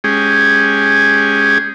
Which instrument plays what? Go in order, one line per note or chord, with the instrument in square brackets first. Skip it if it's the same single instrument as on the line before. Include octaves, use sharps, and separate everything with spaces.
[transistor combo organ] G#3 C#4 G4 G#4